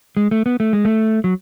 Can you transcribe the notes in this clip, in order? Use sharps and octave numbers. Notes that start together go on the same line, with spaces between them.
G#3
A3
B3
A3
G#3
A3
F#3